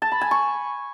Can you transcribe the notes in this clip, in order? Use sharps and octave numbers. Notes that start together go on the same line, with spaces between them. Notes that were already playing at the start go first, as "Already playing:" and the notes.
A5
B5
G#5
C#6